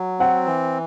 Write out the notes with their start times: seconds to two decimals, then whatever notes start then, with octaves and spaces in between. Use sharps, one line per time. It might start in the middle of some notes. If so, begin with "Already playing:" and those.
Already playing: F#3
0.19 C4 F#5
0.46 E3